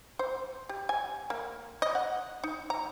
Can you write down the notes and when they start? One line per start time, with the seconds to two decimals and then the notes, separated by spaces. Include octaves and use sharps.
0.19 C5
0.69 G4
0.89 G#5
1.30 A#3
1.82 D#5
1.95 F#5
2.44 D#4
2.70 A#5